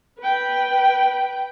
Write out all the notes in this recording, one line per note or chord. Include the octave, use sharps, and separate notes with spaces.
B4 G5